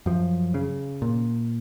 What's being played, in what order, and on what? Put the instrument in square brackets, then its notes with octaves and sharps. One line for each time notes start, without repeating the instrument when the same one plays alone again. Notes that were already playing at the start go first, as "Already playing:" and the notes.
[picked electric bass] F#2 F3
C#3
A#2